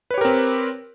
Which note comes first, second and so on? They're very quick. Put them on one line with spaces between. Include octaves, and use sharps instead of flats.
B4 C#5 G4 A#4 C4